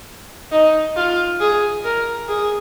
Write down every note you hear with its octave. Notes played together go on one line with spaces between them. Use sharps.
D#4
F4
G#4
A#4
G#4